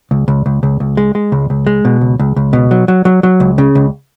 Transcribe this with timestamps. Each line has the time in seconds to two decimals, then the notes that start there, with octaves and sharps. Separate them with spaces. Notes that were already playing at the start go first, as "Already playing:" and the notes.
0.11 C#2
0.28 C#2
0.46 C#2
0.63 C#2
0.80 C#2
0.97 G#3
1.15 G#3
1.32 C#2
1.50 C#2
1.67 G#3
1.85 B2
2.01 C#2
2.19 C#2
2.36 C#2
2.53 B2
2.71 F#3
2.88 F#3
3.05 F#3
3.23 F#3
3.40 C#2
3.58 C#3
3.75 C#2